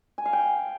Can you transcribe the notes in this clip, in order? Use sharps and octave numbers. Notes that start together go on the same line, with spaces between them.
G#5
F5
G5